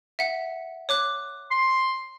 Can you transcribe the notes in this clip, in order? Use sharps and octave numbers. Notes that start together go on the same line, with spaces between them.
E5 F#5
C#5 D6 F#6
C6